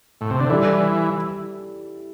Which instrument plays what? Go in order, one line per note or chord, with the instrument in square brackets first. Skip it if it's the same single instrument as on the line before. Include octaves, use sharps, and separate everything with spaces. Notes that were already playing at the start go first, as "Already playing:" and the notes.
[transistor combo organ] A2
C3
D3
[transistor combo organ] E3 [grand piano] G3 E4 A4 D5